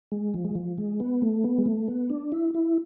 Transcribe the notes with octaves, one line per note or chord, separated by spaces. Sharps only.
G#3
F3
G#3
F3
G#3
B3
A3
B3
G#3
A3
B3
D4
E4
E4